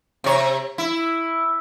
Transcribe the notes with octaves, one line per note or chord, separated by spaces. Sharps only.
C3 C#5
E4